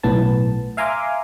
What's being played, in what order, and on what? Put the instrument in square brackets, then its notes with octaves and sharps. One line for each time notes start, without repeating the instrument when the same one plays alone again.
[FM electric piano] B1 A2 B3 A5
E5 F5 G#5 A#5 C6 D6